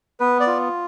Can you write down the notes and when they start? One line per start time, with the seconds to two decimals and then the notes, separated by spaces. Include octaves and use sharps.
0.20 B3 B4
0.40 D5
0.47 F4